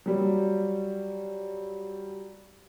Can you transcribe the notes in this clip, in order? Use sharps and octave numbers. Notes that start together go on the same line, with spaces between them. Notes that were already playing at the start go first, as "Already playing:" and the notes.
F#3 G3